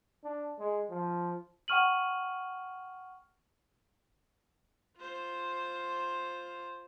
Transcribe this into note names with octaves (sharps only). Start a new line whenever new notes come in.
D4
G#3
F3
F#5 G5 C#6 F6 D#7 F#7
F4 C5